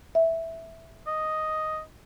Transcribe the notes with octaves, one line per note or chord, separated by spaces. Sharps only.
E5
D#5